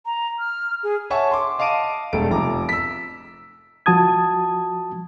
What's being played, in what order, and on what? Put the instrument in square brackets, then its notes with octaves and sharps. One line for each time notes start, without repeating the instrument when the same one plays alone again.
[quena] A#5
F6
G#4
[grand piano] C#5 E5 F#5 G#5 A5 C#6
C6 D6
D#5 F5 A5 D6 D7 D#7
E1 G3 A3 A4 D7
F1 F3 A#5 D6
E6 B6
[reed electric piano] F3 F#4 A5 D#6 G#6